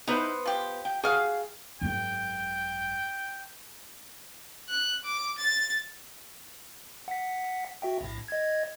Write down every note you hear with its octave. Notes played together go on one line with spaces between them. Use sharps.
B3 D#4 E4 B4 C5
F3 G4
G5
F#4 G#4 F5
G#1 F#2 G5
F#6
D6
A6
F#5 B6
F#4 E5 G5
A#1 A2
D#5 G#6